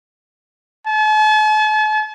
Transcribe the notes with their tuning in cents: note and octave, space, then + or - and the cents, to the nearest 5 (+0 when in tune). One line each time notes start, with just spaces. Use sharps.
A5 -45